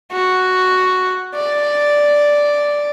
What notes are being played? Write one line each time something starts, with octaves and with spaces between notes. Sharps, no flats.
F#4
D5